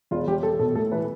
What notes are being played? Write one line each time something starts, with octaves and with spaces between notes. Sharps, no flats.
E1 F4
E1 G4
E1 A4
B2 A4
A2 A4
E3 B4